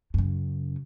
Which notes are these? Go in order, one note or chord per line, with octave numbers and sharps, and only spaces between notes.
F#2 C#3